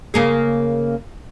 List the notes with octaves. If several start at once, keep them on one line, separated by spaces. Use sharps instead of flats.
C#3 A#3 G#4